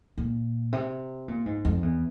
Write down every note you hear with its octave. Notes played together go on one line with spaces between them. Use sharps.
A#2
C3
A#2
G#2
F2
E2